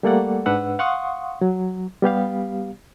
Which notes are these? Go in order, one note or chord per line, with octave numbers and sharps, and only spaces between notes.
G3 A3 A#3 A4 D5 F#5
G#2 D4 B4 F#5 E6
F5 F#5 C6 C#6 D#6
F#3
G3 B3 G4 F5